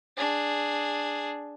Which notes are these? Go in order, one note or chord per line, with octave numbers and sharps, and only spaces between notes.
D4 G#4